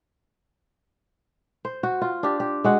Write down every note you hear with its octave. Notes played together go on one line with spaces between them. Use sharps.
C5
F#4
F4
D4 G4
G4
G#3 F#4 F#5